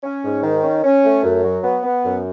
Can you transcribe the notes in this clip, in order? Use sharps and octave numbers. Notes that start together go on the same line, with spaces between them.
C#4
G#2
D#3
C#4
C#4
A3
F#2
F#3
B3
B3
F#2